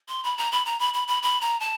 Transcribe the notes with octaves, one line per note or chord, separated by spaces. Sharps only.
C6
B5
A#5
B5
A#5
B5
B5
B5
B5
A#5
A5